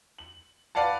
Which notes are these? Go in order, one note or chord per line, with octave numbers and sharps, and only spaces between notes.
F#7
B4 D5 F5 F#5 A5